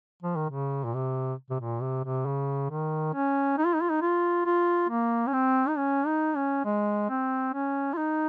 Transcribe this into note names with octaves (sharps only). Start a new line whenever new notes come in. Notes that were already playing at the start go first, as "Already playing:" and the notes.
F3
D#3
C#3
A#2
C3
C3
A#2
C3
C3
C#3
D#3
C#4
D#4
F4
D#4
F4
D#4
F4
F4
A#3
C#4
C4
D#4
C#4
D#4
C#4
G#3
C4
C#4
F4
D#4